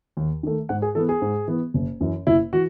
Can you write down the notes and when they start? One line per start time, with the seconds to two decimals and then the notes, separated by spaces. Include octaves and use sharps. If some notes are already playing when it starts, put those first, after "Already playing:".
0.17 D#2
0.43 D#3 A3
0.69 G#2 F#5
0.82 G#4
0.95 E3 B3 A4
1.09 G#4
1.22 G#2
1.48 E3 B3
1.74 F#1
2.01 F#2 E3
2.27 F#1 E4
2.53 E3 F#4